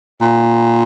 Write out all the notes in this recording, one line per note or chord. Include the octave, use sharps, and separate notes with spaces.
A#2